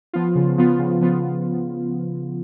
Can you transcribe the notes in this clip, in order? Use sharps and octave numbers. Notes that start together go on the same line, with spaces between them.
F3 B3 F4
C#3
F3 B3 F4
C#3
F3 B3 F4